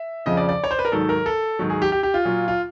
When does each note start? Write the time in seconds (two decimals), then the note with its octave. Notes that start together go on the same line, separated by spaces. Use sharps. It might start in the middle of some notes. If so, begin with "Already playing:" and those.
Already playing: E5
0.26 F2 C#3 F3 D#5
0.37 D5
0.49 D5
0.64 C#5
0.71 C5
0.79 B4
0.85 A#4
0.92 G#2 D#3 F#3 A4
1.09 A#4
1.26 A4
1.59 G#2 D#3 F#3
1.70 G#4
1.82 G4
1.92 G4
2.03 G4
2.14 F4
2.25 A#2 F#3
2.48 F4